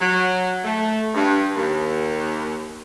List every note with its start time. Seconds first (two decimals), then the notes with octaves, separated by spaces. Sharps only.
0.01 F#3
0.64 A3
1.14 G2
1.57 D#2